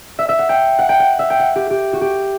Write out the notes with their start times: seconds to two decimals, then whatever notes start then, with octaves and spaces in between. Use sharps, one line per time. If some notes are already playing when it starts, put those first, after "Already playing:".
0.19 E5
0.29 E5
0.39 F#5
0.49 G5
0.79 F#5
0.89 G5
1.00 F#5
1.19 E5
1.30 G5
1.39 F#5
1.56 G4
1.70 G4
1.93 F#4
2.01 G4